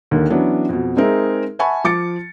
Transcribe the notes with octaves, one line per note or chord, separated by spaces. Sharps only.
D#2 D3 D#3
E3 F#3 B3 C#4 D4
F2 B2
G#3 C4 D#4 G#4 A#4 E5
E5 F#5 G#5 A5 B5 C#6
F3 D6 A6 C#7